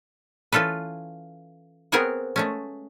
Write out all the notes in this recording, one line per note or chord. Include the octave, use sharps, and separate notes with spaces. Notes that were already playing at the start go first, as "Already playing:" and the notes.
E3 C#4 F4 A4 B4
B3 C4 G#4 A#4 C#5 F#5
G#3 A3 C#4